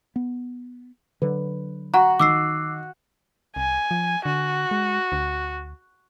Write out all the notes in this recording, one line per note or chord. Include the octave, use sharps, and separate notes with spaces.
B3
D3 F#3 B4
F#4 F#5 A#5
D#3 D6 E6 C7
C2 G#5
F3
D3 F#4
G#3
D2